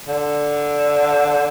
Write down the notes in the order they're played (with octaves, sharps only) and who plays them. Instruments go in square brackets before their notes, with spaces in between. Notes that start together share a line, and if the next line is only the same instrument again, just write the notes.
[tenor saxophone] D3